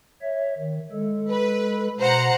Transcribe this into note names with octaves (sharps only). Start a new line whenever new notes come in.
C#5 E5
D#3
G#3 A4
B4
B2 C5 F#5 A#5